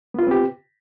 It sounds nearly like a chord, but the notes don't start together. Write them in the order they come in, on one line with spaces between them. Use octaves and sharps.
B3 F4 B4 C4 G4